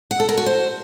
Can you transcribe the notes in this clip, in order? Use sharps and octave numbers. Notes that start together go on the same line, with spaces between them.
F#5
A4
A#4
F#4
C5